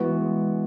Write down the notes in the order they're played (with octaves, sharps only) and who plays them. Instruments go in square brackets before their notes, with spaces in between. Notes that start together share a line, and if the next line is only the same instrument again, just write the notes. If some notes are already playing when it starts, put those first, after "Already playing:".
Already playing: [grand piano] E3 B3 F#4 [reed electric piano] G#3
[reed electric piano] G#3